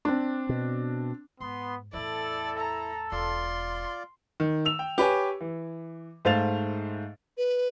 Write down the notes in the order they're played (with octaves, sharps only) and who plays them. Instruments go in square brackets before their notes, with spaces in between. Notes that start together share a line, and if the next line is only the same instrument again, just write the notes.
[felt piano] C4 D4
[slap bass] B2
[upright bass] G#2 [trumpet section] B3 [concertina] C6
[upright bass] E2 A2 [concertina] E4 [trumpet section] A4 [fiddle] D5
[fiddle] A#5
[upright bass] E1 [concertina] F4 D5 [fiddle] C6
[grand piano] D#3
E6 F7
G5
G4 B4 C#5 G#5
E3
G#2 A3 C5 F5 A6 F7
[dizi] B4